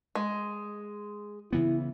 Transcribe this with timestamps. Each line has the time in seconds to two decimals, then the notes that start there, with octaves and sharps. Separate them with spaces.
0.15 G#3
1.53 C#3 E3 B3 E4